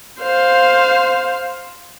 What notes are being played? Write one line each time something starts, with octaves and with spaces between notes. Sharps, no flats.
C5 F5